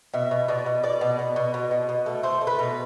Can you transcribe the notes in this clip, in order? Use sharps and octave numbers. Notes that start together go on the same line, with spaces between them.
B2 E5
B2
B2 D5
B2
B2 D5
B2
B2
B2
B2
B2
B2
A3
A3 C5
A3
B4
B2